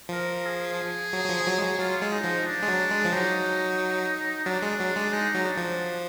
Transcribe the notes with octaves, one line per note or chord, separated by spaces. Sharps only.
F3 A#4
G#4
F#3
F#3
F3
F#3
G#3
F#3
F#3 F4
G#3
D#4
F3
D4
G#3
F#3
G#3
F3
F#3 D#4
F#3 D4
G#3
F#3
G#3
G#3 D#4
F#3
D4
F3